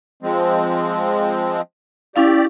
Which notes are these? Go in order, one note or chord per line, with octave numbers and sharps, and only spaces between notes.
F3 G#3 C4
C#4 E4 G4 D5 F5